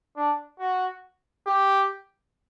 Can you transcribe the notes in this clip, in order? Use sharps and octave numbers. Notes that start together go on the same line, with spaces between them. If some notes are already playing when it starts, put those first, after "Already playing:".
D4
F#4
G4